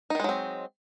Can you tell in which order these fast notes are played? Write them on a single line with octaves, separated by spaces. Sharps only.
D#4 D#3 G#3 F#3 C4